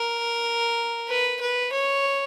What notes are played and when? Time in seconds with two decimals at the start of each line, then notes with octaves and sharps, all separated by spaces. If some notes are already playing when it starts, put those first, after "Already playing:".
Already playing: A#4
1.08 B4
1.41 B4
1.72 C#5